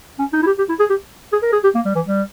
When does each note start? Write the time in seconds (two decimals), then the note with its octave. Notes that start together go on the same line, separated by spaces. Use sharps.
0.19 C#4
0.33 D#4
0.42 E4
0.46 G4
0.58 G4
0.69 E4
0.79 G#4
0.90 G4
1.32 G#4
1.42 A#4
1.53 G#4
1.64 G4
1.75 A#3
1.85 G3
1.95 E3
2.06 G3